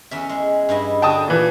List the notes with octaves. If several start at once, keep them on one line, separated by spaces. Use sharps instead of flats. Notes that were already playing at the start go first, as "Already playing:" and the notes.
E2 C#4 E5
G#3
G2 E4 D#5
D3 F#4 G5 A5 D#6
A#2 E3